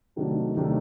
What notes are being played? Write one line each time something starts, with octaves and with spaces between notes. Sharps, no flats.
C3 D#3 F#3 A3 D4
C3 D#3 F#3 A3 D4